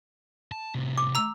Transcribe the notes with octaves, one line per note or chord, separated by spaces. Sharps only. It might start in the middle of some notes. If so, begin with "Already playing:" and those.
A5
A2 C3
D6
A#5 E6